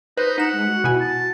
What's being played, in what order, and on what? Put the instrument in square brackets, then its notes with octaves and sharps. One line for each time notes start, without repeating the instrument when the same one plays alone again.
[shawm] D#4 [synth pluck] B4 C5 [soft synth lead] B6
[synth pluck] D#4 E7 [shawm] F#5
[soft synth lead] G#3
F#4
[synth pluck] B2 E4 G#5
[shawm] A5